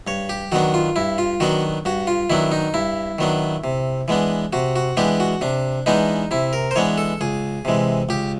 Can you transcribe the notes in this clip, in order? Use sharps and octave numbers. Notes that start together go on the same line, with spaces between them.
G2 C#5
G4
D#3 F#3 B3 D4 F#4
F4
G2 E4
F4
D#3 F#3 B3 D4 F#4
G2 F#4
F4
D#3 F#3 B3 D4 E4
D#4
G2 E4
D#3 F#3 B3 D4
C3
E3 G#3 B3 D4
C3 F#4
F#4
E3 G#3 B3 D4 G4
F#4
C3 D4
E3 G#3 B3 D4 D#4
C3 E4
A#4
C5
E3 G#3 B3 D4 C#5
A4
C#2 G#4
C3 E3 G#3
C#2 G4